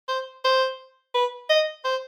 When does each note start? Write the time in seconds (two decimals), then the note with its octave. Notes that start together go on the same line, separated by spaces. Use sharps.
0.08 C5
0.44 C5
1.14 B4
1.49 D#5
1.84 C5